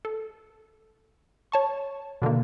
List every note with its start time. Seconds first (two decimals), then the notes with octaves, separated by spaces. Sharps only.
0.05 A4
1.52 C#5 A5 C#6
2.22 B2 D3 D#3 A#3